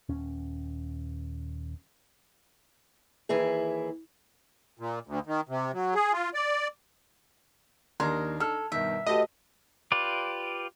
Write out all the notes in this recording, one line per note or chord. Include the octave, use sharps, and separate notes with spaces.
D#1 C#4
D#2 E3 E4 G#4
A#2
D2
D#3
C3
F#3
G#4
F4
D5
D#2 D4 D#4 A#4 C6 G#6
A4 F6
G2 B2 D#3 E5
A3 F#4 G4 B4 D#5 A5
F4 G4 B4 D5